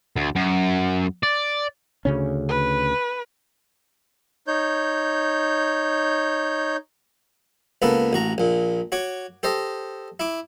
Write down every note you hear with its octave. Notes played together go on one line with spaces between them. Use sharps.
D2
F#2
D5
D2 C#3 C#4
B4
D#4 C#5 G6
C#2 A#3 B3 A4 B4
A1 F#4 A#5
A#1 A#2
F#4 C#5 D6
G4 A4 C5 D#5
E4 D6